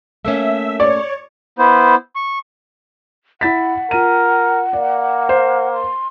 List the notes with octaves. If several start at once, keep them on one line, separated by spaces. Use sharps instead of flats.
A3 A#3 C#4 E5
C#5 D5
B3 E4 C5
C#6
E4 F#5 A6 B6
F4 A#4 D#7
A#3 D5
C5
C6